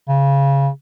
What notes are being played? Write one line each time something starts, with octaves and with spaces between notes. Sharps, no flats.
C#3